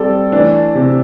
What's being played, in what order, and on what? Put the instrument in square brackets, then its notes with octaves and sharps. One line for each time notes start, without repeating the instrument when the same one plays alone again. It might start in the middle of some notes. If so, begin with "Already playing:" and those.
Already playing: [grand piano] G3 C4 [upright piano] A4 D5
[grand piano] E3 A3 [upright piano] D4
[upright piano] C3